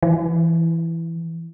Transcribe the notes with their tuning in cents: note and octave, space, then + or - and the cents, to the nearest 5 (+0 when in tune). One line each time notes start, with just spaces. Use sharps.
E3 +5